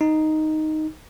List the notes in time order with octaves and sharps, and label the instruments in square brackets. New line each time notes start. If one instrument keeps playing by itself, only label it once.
[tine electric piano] D#4